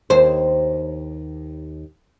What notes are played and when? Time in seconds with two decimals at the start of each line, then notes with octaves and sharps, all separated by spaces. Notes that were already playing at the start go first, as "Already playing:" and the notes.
0.10 D#2 C5